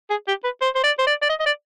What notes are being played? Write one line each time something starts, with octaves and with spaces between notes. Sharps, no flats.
G#4
G4
B4
C5
C5
D5
C5
D5
D5
D#5
D#5
D5